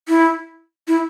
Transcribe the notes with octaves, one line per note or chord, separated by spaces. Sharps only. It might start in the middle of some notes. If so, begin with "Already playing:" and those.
E4
E4